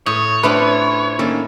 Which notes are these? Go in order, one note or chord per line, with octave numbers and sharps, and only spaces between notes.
A2 C#5 C#6 D#6 G6
A3 C4 D4 F4 B4 B5
D#3 A#3 C#4 A4